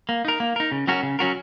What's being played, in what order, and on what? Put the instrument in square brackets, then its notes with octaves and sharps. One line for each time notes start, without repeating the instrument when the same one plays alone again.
[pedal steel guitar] A#3
D#4 A#4
A#3
D#4 A#4
C#3
F#3 C#4 F#4 A#4
C#3
F#3 C#4 F#4 A#4